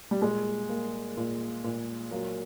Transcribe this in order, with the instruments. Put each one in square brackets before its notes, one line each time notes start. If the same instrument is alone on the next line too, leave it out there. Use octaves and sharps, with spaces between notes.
[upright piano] G3
[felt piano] A#2 [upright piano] G#3
[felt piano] A#3
A#2
A#2
[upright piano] F#3 [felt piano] A#3